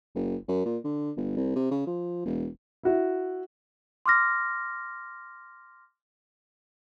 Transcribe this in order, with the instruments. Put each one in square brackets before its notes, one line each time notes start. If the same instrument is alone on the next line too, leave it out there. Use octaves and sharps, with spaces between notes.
[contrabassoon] F#1
F#2
A#2
D3
G1
C2
C3
C#3
F3
E1
[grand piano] E4 F#4 E5
[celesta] C6 D6 F6 A#6